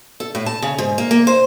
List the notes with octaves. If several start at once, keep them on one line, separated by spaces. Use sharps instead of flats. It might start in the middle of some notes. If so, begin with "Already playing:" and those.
A4
A2
A5
C#3
G#2
A#3
A#3
C5